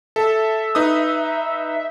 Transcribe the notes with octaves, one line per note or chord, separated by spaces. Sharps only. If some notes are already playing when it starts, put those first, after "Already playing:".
A4 E5
D#4 B4 D#6